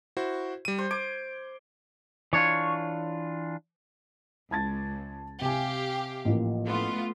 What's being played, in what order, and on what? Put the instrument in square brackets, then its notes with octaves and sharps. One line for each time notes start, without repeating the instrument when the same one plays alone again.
[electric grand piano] E4 F#4 C5
G3 D#7
[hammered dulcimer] C5
[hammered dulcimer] D6 [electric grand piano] G#6
[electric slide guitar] E3 D4 F4 [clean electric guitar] C#5
[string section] C#2 [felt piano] A5 G#6 A6
[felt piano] C3 G#5 [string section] G4 F5
[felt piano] A1 F3 A#3
[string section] A3 B3 F4